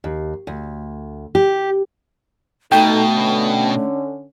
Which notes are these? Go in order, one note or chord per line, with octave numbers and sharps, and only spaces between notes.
D#2
D2
G4
B2 A3 D#4 A4 G5
D3 C#4